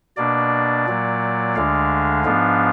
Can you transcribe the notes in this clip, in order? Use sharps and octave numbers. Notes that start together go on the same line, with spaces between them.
B2 A#3 D4 D5
A#2 F#3 A#3
D2 D3 G#3 D4 F5
G#2 F3 B3 D4